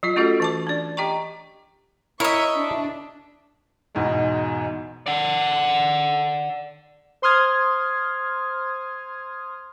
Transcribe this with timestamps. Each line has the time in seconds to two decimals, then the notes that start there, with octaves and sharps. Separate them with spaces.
0.03 F#3 F4 D#5
0.16 A3 C#4 F4 F#4 G#4 A4
0.40 E3 A5 D6
0.67 D4 D5
0.97 G4 D#5 G5 A#5 C#6
2.20 E4 A#4 C#5 D#5 E5 C#6
2.56 D4
3.95 B1 E2 G#2 B2 E3 G#3
5.06 D5 F#5
7.22 C5 C6 D#6 F6 G#6